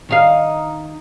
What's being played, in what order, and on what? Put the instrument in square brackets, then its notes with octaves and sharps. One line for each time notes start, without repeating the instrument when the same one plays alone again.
[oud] D#3 D#4 F5